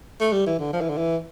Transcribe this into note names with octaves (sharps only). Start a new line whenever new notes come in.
A3
G3
E3
D3
F3
E3
D3
E3